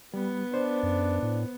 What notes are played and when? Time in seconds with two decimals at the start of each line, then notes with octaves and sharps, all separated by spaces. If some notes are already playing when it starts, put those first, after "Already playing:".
0.14 G3 B3
0.54 D4 C5
0.83 F#2
1.22 A2